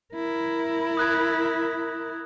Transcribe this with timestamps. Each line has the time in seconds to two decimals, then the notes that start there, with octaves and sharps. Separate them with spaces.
0.15 E4 A#4
0.97 D#6 F#6 G#6